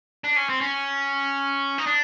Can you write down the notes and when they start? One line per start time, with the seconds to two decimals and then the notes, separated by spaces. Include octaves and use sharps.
0.24 D4
0.36 C#4
0.49 C4
0.61 C#4
1.78 D#4
1.86 D4